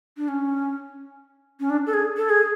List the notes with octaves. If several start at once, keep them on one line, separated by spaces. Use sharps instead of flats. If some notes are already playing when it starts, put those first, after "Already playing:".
D4
C#4
C#4
D4
A4
G#4
A4
G#4